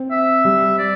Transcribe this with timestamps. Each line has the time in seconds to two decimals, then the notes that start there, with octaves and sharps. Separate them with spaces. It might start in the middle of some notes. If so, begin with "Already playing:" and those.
Already playing: C4
0.11 E5
0.45 G3
0.79 D5